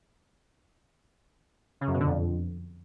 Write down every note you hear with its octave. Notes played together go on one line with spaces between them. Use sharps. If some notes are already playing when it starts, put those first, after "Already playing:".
C#3
F#2
B2
D3
F2